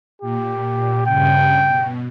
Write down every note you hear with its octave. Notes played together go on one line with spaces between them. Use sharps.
A#2 G4
G2 C#3 G5
B2